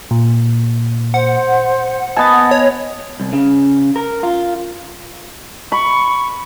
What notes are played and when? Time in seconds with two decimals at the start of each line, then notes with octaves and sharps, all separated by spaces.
0.11 A#2
1.14 C5 F#5
2.17 B3 D#5 G#5 A5 A6
2.51 C#5
3.20 C2
3.33 C#3
3.96 A#4
4.23 F4
5.72 B5 C#6